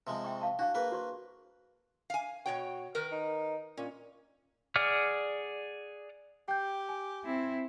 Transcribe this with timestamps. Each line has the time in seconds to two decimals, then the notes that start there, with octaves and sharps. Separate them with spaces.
0.07 C3 F3 G#3
0.24 E5 G5 C#6
0.41 F5 A5
0.59 D4 F#4 F5 C#6
0.75 A#3 G#4 B4
0.92 F#4 C5 C#6
2.10 F5 G#5
2.46 B2 F#4 C#5 G5
2.95 D#3 A#4 B4
3.12 D#4
3.77 A#2 C#4
4.76 G#4 D5 F#5 D6 F6
6.48 G4 G5 G6
6.89 G#5
7.25 C4 E4